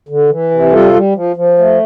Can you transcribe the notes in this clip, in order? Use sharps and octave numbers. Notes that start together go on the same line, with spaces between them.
D3
E3
C3
G3 F4 A4
G3
F3
F3
A3